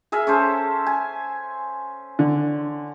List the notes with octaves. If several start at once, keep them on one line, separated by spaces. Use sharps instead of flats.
G#4 A#4 E5
C#4 A4 C5
G#5
D3